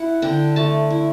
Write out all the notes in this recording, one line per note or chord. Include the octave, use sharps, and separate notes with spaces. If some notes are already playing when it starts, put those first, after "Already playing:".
Already playing: E4 F#5
D3 G5
A3 A5
E4